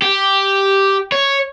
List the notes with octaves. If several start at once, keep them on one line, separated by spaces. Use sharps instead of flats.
G4
C#5